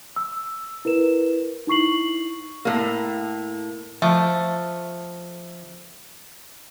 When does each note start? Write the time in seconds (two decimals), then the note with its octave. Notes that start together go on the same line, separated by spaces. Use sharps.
0.16 E6
0.85 E4 A#4 B4 E7
1.67 D#4 E4 C#6 C7 F#7
2.65 A2 A#3
4.02 F3 A3